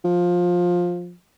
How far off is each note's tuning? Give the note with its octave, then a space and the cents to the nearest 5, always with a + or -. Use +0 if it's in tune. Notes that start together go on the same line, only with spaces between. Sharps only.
F3 +15